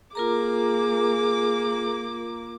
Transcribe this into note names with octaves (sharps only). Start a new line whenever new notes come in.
A#3 F4 G#4 A#4 A#5 D6